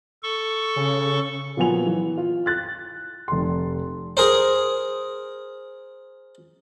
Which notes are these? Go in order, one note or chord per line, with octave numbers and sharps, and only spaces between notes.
A4 C#6
C#3
A#2 F3 F#3 B3 G#5 F7
E3
F4
F#6 A6
F1 C6
G#4 A#4 C5